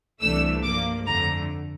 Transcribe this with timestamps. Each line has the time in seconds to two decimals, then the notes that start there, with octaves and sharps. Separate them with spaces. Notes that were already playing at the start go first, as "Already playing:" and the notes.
0.21 C2 C3 E3 A3 D4 E6
0.63 G2 F3 A#3 D6
1.06 F2 D3 A3 A#5